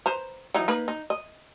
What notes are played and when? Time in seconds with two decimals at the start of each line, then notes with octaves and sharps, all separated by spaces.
0.06 B4 C5 A#5
0.54 E3 F#3 D#4
0.68 A#3 D#4 B4
0.88 D#4
1.10 D#5